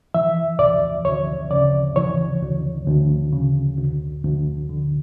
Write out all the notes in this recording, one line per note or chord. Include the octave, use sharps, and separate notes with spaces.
E3 E5
D2 D5
D2 C#5
C#3 D5
E3 C#5
D2
D2
C#3
D2
D2
D3